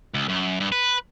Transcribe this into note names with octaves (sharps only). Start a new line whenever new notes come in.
C#2
F#2
G2
B4